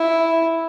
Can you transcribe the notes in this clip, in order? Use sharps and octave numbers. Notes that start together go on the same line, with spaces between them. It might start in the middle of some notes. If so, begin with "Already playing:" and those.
Already playing: E4